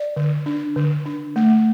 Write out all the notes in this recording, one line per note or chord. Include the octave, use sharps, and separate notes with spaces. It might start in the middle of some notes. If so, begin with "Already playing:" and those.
Already playing: D5
D3
D4
D3
D4
A3